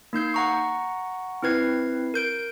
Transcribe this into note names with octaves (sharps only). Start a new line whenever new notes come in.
A#3 D#4 G6 C7
F#5 A#5 C#6
C4 E4 B4 G#6 C7
A#4 G6 D7